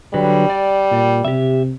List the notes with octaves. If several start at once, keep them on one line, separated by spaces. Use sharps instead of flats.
D3 F#3 G3 B4
D5
A#2
C3 G4 E5